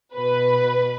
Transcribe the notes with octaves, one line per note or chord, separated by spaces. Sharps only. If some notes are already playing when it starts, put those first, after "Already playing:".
B2 B4